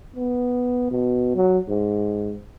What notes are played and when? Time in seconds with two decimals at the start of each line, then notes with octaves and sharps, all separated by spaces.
0.16 B3
0.91 B2
1.35 F#3
1.69 G#2